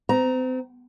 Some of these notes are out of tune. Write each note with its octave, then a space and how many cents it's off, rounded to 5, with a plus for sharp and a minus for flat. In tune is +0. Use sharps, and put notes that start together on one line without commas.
C4 -35 A#5 +5